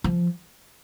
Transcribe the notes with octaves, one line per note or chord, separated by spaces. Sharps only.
F3